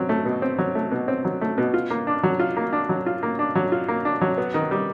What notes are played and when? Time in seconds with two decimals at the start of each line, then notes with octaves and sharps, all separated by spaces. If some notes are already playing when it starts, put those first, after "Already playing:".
Already playing: F#3 C4
0.09 A3
0.25 B2
0.42 C4
0.58 F#3
0.75 A3
0.92 B2
1.08 C4
1.25 F#3
1.41 A3
1.58 B2
1.74 F4
1.90 A#3
2.07 D4
2.23 F#3
2.39 F4
2.57 A#3
2.73 D4
2.89 F#3
3.06 F4
3.23 A#3
3.39 D4
3.55 F#3
3.72 F4
3.88 A#3
4.05 D4
4.21 F#3
4.38 B3
4.54 D#3
4.71 G3